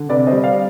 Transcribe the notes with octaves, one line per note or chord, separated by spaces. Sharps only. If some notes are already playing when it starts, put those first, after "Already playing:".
Already playing: D3
C3 B4 D5
C5 D#5
G3
D5 F5